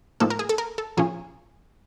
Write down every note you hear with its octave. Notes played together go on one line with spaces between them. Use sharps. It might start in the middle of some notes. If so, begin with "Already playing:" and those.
A2 F3 A#3 D#4 A4
A#4
G#4
A4
A#4
A4
A#2 F3 A#3 C#4 G#4